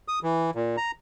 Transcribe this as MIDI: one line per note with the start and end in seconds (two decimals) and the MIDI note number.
0.08 0.19 87
0.23 0.51 52
0.55 0.76 46
0.77 0.91 82